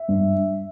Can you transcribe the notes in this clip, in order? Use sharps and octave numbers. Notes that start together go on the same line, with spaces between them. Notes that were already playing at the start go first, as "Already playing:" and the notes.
Already playing: E5
G2